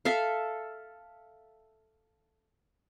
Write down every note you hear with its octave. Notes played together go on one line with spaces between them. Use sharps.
A4 E5 F5